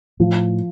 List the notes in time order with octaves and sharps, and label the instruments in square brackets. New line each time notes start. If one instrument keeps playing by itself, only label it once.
[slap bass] A2 [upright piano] F3